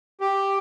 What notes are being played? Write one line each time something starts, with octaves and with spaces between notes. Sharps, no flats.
G4